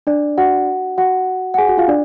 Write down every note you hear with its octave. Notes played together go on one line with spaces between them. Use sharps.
D4 D5
F#4 F#5
F#4 F#5
F#5
G#4 G#5
F#4 F#5
F4 F5
D4 D5